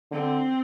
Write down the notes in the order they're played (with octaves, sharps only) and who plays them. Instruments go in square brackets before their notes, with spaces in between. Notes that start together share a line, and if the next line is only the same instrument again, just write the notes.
[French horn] D3 [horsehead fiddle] C4